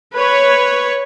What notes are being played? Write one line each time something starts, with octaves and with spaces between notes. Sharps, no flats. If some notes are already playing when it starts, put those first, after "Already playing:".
B4 C#5